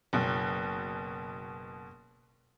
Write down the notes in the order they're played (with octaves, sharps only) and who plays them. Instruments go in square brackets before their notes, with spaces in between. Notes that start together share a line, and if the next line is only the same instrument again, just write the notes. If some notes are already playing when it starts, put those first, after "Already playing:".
[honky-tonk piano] F#1 B2